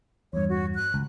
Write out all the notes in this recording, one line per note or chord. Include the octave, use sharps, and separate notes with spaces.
E2 G2 C#5
F#4
F#6
C#2